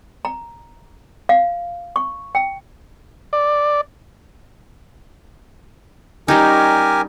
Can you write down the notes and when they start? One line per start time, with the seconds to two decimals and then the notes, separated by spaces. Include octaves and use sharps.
0.25 A#5
1.29 F5
1.96 C#6
2.35 G5
3.33 D5
6.28 G3 C#4 D#4 G4 A#4 G#5